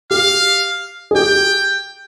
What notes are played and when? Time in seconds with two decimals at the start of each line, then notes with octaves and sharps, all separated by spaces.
0.11 G4 F5
1.11 G#4
1.15 G4 G5